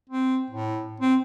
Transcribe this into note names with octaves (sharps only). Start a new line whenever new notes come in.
C4
A2
C4